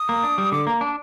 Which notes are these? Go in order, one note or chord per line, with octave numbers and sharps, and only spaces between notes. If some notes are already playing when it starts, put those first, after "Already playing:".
Already playing: D#6
A#3
D4
G3
D3 D6
A#3 A#5
D4